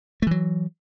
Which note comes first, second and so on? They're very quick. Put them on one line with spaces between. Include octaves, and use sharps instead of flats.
A3 E3 F#3